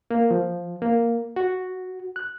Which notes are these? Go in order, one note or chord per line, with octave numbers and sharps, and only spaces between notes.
A#3
F3
A#3
F#4
F#6